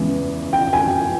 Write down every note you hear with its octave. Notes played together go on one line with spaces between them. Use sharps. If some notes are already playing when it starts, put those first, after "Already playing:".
Already playing: E2 C#3 E3 G#3 B3
G5
G#5